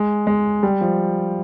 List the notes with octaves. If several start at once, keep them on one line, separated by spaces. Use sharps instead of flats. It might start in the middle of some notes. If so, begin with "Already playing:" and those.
Already playing: G#3
G#3
G3
F3